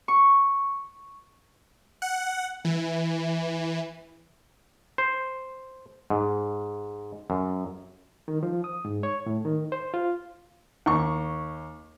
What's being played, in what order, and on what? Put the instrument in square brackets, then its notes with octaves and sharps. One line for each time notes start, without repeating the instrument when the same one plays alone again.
[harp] C#6
[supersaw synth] F#5
E3
[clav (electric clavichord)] C5
G#2
F#2
[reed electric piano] D#3
F3
D#6
G#2
C#5
A2
D#3
C5
F4
[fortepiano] D#2 C#6